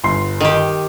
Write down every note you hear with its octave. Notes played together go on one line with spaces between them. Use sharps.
G1 C6
D#3 G4